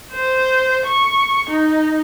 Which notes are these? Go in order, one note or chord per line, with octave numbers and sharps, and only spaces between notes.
C5
C#6
D#4